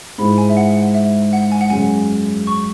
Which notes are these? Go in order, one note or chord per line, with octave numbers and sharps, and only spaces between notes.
G#2 G#3 E4 B5
G#5
E5
F#5
F#5
E5
F#5
G#5
F#5
F#2 C#3 G#3 G#5
C#6